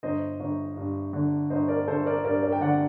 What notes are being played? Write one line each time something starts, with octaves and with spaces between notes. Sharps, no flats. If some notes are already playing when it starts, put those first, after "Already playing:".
G1 C5 D#5
G1
G2
D3
G1 C5 D#5
A#4 D5
G1 A4 C5
A#4 D5
G2 A#4 D5
A#4 D5
G5
D3 D5 F#5